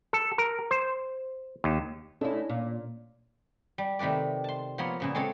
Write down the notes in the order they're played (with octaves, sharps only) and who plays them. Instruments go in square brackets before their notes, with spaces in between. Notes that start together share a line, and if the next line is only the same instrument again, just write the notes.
[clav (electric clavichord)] A4
A#4
C5
D#2
[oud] A3 E4 [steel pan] C#4 D4 D#5
[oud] A#2
[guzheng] G3
C3 D#3 A3 B4 D5
A5 C6
F3 A#3 B3 C#5 C6
A#2 C#3 B3
G#3 C4 A4 C#5